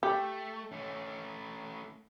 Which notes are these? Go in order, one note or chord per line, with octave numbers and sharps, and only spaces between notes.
A3 G4
A3 C#4